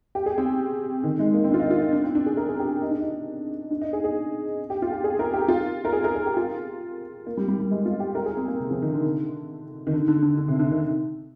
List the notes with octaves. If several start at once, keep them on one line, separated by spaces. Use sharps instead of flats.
G4
G#4
C4
D#3
G#3
A#3
C4
D4
F4
D#4
F4
D#4
D4
C4
D4
G#4
A#4
G#4
G4
D#4
D4
D#4
D4
D#4
G#4
G#4
G4
F4
G4
G#4
A#4
G4
F4
A#4
G#4
A#4
G#4
G4
F4
A#3
G3
G3
G3
G#3
F4
G4
A#4
G#4
C4
A#3
C3
F3
D#3
D3
D#3
D3
D3
D3
D3
C3
D3
D#3